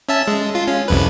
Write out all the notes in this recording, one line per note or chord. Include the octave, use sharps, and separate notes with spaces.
C#4 E5 A5
G#3
F4
C#4
C2 F2 B4